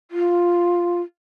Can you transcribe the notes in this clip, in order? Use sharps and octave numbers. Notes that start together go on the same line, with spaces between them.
F4